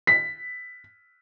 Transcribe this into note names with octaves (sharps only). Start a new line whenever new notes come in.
B6